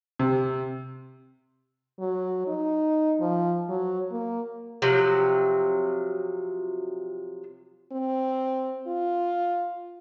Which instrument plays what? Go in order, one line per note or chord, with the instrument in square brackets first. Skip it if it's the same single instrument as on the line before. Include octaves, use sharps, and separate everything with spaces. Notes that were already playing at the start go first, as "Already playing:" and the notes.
[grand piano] C3
[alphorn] F#3
D#4
F3
F#3
A#3
[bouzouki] C3 F3 F#3
[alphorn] C4
F4